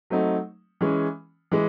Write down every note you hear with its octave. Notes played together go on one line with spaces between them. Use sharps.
F#3 A3 C4 D#4
E3 G#3 C#4
E3 G#3